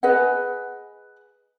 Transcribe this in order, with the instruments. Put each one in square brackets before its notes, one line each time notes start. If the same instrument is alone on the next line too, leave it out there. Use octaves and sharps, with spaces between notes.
[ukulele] G#4 B4 D#5 F#5